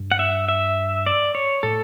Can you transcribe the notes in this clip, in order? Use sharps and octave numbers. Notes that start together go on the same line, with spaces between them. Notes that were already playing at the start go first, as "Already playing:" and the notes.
Already playing: G2
F#5
E5
E5
D5
C#5
A2 A4